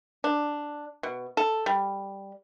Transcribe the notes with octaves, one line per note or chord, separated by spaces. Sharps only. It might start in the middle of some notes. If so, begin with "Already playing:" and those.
D4
B2
A4
G3